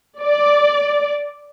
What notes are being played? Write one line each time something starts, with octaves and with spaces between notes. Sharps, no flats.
D5